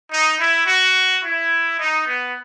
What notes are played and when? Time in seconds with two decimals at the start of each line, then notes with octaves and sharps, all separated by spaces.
0.10 D#4
0.38 E4
0.65 F#4
1.22 E4
1.78 D#4
2.06 B3